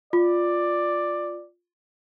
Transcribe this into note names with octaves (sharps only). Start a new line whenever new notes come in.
F4 D5